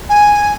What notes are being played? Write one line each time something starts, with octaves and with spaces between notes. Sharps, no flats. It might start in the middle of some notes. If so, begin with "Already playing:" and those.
G#5